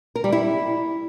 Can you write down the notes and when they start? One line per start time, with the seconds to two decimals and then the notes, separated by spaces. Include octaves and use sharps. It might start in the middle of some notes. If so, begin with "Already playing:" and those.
0.15 A#4
0.24 G3
0.32 E4